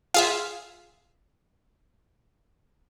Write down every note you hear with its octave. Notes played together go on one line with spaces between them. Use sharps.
F4 G#4 E5